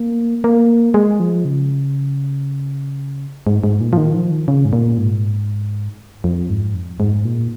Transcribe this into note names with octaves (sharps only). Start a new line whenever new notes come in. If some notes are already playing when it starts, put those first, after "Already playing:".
Already playing: A#3
A#3
G#3
F3
C#3
G#2
G#2
A#2
F3
D#3
F3
D#3
C#3
G#2
A#2
G#2
F2
G#2
F2
G#2
A#2